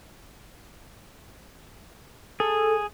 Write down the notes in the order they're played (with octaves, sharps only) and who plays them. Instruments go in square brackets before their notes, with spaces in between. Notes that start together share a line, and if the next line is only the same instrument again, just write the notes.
[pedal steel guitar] G#4 [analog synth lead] A4